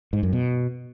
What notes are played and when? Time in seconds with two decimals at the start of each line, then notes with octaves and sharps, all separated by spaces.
0.13 G#2
0.23 F#2
0.33 B2